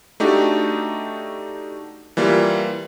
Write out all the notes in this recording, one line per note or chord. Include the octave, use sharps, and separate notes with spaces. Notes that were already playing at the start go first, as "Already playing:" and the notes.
A3 D4 D#4 F#4 G4
E3 G3 A#3 F4